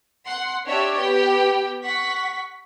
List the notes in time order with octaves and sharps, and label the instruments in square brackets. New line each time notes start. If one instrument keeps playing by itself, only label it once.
[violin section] F#5 C6
D4 G4 C#5 D5 E5
B3 G4 G5
F#5 C#6 B6